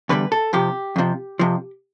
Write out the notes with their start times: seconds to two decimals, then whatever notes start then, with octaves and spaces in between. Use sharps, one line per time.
0.09 E2 D3 G3 B4
0.32 A4
0.53 F2 C3 F3 G4
0.96 F2 C3 F3
1.39 F2 C3 F3